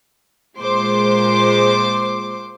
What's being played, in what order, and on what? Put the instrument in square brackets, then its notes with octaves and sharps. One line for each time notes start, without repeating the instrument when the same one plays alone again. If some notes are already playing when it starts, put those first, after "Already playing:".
[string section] A#2 G#3 C5 C6 D6